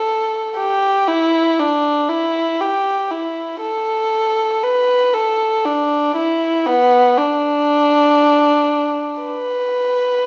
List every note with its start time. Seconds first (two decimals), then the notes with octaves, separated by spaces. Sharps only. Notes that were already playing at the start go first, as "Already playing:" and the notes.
Already playing: A4
0.57 G4
1.08 E4
1.59 D4
2.09 E4
2.61 G4
3.11 E4
3.61 A4
4.63 B4
5.14 A4
5.65 D4
6.16 E4
6.66 B3
7.18 D4
9.20 B4